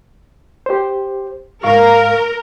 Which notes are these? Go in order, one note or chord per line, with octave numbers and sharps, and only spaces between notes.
G4 C5
G#2 A#4 F5 C#6